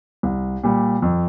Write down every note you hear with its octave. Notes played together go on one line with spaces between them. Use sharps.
C2
A#2 G3
F2